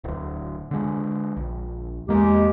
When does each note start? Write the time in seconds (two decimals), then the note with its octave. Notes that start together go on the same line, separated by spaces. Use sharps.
0.04 D1 D2
0.71 D3 G#3
1.37 A#1
2.08 E2 G#3 A#3 G4